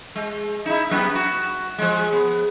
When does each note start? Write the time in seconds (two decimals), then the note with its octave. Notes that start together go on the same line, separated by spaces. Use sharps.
0.16 G#3
0.66 D#4 E4
0.91 F#2 B3
1.15 F#4
1.78 F3 G#3
2.13 B3